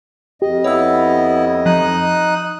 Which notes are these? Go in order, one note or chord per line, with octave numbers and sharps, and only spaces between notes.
F2 G4 D#5
B3 E4 C#5 E6
F3 D#4 D#6 F#6